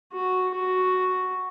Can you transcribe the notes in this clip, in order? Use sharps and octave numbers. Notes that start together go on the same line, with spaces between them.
F#4
F#4